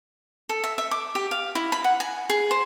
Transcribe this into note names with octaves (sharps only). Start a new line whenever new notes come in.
A4
E5
E5
D6
G4
F5
E4
B5
F#5
G#5
G#4
C5